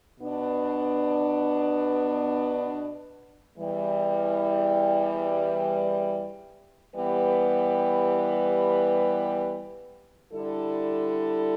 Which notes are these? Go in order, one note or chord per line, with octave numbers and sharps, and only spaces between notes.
B2 B3 D4
E2 E3 G3
E3 G3 B3 G4 B4
D3 G3 E4 A4